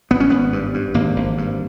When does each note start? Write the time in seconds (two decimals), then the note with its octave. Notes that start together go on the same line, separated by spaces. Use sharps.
0.11 G#1 B3
0.20 C#4
0.30 G#1 B3
0.53 G2
0.74 G2
0.94 G#1 A#3
1.16 G#1
1.38 G2